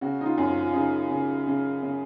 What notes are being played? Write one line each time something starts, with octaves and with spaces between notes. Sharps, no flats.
C#3 F#4
D#4
F4
F#2
F4
F4
C#3 D#4
C#3
C#3
C#3